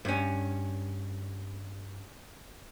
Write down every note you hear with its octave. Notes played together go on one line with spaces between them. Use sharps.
G2 C#4